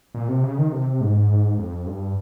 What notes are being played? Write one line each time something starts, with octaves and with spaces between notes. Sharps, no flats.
A#2
C3
C#3
D#3
C3
G#2
G#2
F2
G2